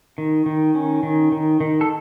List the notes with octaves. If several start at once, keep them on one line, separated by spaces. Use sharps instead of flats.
D#3
D#3
C#4
D#3
D#3
D#3
A4